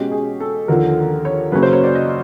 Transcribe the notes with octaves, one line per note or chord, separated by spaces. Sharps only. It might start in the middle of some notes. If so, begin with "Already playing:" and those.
Already playing: B2 G#3 C#4 G4
G#4
A4
D#2 D3 F3 A#4
C#5
F#2 C#3 F#3 A#3 C#4 B4
C5
C#5
D5
D#5